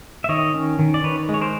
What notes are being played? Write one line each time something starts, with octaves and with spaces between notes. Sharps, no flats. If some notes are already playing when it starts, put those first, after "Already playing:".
E5
D#3 C#5 D#5
C#4
D#3
D5
D#3 B4 C#5
G#3
C#5
A#4 C5